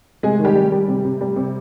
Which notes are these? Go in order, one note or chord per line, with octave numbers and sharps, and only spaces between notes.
C3 G#3 G#4
D#3
G3 G4
G3
G3
C3
C3
G3
C3